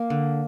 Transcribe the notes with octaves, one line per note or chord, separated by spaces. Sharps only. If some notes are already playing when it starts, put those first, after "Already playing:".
Already playing: A#3
D3